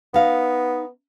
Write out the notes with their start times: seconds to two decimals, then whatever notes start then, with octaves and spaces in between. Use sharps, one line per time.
0.14 B3 D#4 F5